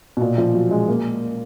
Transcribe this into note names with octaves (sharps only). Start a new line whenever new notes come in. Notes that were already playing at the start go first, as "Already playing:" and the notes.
B2
A#2
F3
F#3
G#3
A#3